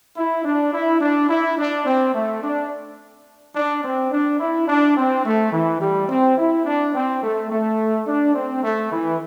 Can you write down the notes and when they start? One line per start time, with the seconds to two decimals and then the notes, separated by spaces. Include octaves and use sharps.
0.17 E4
0.45 D4
0.74 E4
1.01 D4
1.29 E4
1.58 D4
1.86 C4
2.15 A3
2.43 D4
3.56 D4
3.84 C4
4.11 D4
4.40 E4
4.68 D4
4.97 C4
5.25 A3
5.53 E3
5.81 G3
6.09 C4
6.38 E4
6.66 D4
6.94 C4
7.23 A3
7.50 A3
8.07 D4
8.35 C4
8.64 A3
8.92 E3